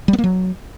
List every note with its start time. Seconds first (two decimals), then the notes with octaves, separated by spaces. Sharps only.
0.08 G3
0.13 B3
0.18 A#3
0.24 F#3